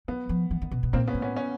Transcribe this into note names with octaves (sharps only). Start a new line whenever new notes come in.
F#3 B3
F3
E3
D#3
B2
B2
A#2 A#3 C4
B3 C#4
A2
B3 C#4
B3 C#4